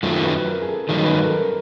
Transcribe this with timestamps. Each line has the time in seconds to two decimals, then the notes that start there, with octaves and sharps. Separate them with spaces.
0.02 F#2 D#3 F#3 A3 C4 F4
0.23 B4
0.46 A#4
0.62 G#4
0.68 A4
0.89 G2 D#3 F#3 A#3 D#4 G#4
1.04 B4
1.11 A#4
1.24 A4
1.32 A#4